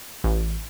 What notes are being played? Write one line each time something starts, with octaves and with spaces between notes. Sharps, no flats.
A1